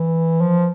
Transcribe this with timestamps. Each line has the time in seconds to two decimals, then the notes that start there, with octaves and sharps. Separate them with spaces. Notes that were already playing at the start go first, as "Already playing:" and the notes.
Already playing: E3
0.41 F3